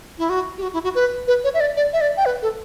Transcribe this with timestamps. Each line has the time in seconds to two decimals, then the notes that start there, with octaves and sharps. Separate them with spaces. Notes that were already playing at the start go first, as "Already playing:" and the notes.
0.18 E4
0.29 F#4
0.58 G4
0.62 F#4
0.73 E4
0.84 F#4
0.95 B4
1.27 B4
1.44 C#5
1.54 E5
1.60 D5
1.76 D5
1.93 E5
2.01 D5
2.17 G5
2.25 B4
2.42 A4